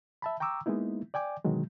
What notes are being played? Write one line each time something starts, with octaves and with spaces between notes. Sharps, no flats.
E5 A5 B5
G5 A#5 C#6 D6 E6
G#3 A#3 B3 D#4 E4
D5 G5 G#5 D6
B2 D3 D#3 F#3 G#3